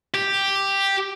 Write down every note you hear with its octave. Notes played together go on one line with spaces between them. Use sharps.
G4